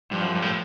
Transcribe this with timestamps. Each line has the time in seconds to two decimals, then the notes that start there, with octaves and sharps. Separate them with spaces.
0.11 G2 F3
0.23 F#2
0.35 G2
0.42 A2